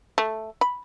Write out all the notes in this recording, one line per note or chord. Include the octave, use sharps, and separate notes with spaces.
A3
B5